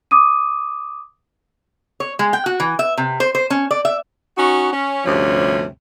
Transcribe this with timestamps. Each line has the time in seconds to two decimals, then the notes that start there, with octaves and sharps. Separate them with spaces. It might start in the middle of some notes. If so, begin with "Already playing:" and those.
0.11 D6 D#6 D#7
2.00 C#5
2.19 G#3
2.33 G5
2.46 F#4
2.60 E3
2.79 E5
2.98 C3
3.20 C5
3.35 C5
3.50 C#4
3.71 D5
3.85 E5
4.38 C#4 D#4 F#4
4.73 C#4
5.05 D2 G2 C3 F3 C#4